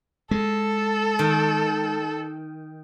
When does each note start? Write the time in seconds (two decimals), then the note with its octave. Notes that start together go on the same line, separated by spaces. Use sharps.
0.31 G#3 A4
1.19 D#3